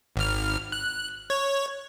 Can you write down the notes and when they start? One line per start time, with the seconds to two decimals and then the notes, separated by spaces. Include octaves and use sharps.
0.16 G#1 F6
0.72 F#6
1.30 C#5